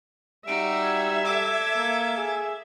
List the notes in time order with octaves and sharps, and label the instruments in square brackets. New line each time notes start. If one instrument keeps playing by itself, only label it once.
[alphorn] G3 [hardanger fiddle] D#4 F#4 [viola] E5 [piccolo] D7
[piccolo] G#6
[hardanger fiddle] A4 D6
[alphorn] A#3
G#4